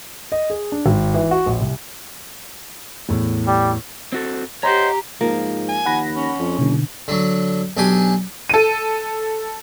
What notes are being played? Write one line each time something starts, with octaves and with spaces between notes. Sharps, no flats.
D#5
G#4
D4
G#1
E3
F#4
A#1
C2
E2 A2
G3
C4 F#4 A4
G4 C5 C#5 D#5 F#5 A#5
G#2 F3 A#3
G#5
D#2 F#5 B5 A#6
C#4
F2
F#1 B2 D3
D3 F#3
B1 D4 G4 G#5
A4 D#7